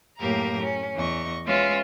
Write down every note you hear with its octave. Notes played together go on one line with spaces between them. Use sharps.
F#2 A2 A#3 G4 A#4 A#5
C#4
E2 D#5 C#6
G#3 C#4 F4 B4 E5